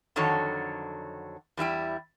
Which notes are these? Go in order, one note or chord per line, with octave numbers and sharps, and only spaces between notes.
F2 D3 D#3 F#3 A4 C#5
E2 G3 E4 G5